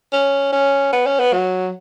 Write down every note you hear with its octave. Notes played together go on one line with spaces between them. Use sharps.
C#4
C#4
B3
C#4
B3
F#3